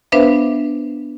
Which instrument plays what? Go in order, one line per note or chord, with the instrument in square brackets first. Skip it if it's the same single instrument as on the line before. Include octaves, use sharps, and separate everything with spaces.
[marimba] B3 D4 B4 C5 E5 F5